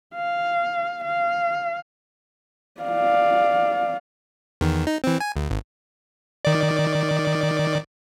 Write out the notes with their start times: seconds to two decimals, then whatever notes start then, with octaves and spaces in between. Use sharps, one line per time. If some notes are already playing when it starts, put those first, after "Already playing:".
0.15 F5
1.05 F5
2.81 D5 F5
4.61 E2 D#3
4.87 D#4
5.04 E3 C4
5.20 G#5
5.36 D2
5.51 G#1
6.45 D#3 D5